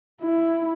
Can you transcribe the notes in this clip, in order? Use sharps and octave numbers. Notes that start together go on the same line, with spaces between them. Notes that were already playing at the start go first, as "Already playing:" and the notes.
E4